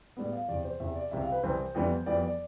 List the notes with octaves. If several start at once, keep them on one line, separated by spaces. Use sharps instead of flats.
A2 G3 B3
F5
E2 C3 E3 D5
C5
E2 C3 E3 E5
D5
C2 C3 E3 E5
F5
B4
C2 C3 E3 C5
F2 E3 G3 B3
F2 E3 G3 B3 D5
D5